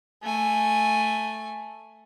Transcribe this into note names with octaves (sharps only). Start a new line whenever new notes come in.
A3 G#5